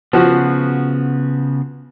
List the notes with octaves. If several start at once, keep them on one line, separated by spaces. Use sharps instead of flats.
C#3 F3 B3 F#4